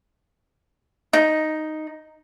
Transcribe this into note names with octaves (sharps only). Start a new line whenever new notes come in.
D#4